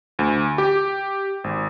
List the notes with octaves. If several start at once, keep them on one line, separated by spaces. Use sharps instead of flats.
D2
G4
G#1